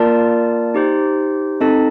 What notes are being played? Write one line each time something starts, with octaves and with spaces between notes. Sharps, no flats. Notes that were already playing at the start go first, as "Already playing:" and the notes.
Already playing: A#3 F4 A#4 D5 A5
D#4 G4 C5
C4 D#4 A4 D#5 A5